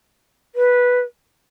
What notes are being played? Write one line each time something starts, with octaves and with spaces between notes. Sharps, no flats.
B4